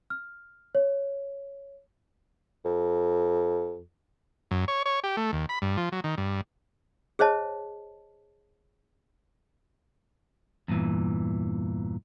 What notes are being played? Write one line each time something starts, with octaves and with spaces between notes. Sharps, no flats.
F6
C#5
F2
F#2
C#5
C#5
G4
A3
D#2
B5
G2
F3
F#3
D#3
G2
G#4 C5 C#5 D#5 A5
E2 G2 A#2 E3